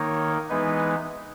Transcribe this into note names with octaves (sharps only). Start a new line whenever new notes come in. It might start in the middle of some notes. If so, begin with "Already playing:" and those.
Already playing: D#3 A#3 D#4 C#5
E3 G#3 B3 D#4 B4